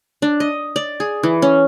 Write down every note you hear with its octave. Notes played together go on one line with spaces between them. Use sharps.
D4
D#5
D5
G#4
E3
C#4